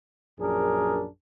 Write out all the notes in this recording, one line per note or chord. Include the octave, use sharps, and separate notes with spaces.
A#1 F#2 D4 G#4 A#4